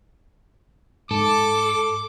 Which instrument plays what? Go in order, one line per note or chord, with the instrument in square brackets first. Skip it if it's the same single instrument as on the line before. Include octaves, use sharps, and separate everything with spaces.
[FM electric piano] G#2 [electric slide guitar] A4 [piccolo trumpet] D6